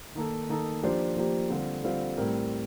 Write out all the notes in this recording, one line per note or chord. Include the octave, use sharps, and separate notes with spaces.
D#3 A#3 D#4 A4
D#3 A#3 D#4 A4
F3 A#3 D4 G4 C5
F3 A#3 D4 G4 C5
D3 G3 C4 F4 C5
D3 G3 C4 F4 C5
A2 G3 C4 G4 A#4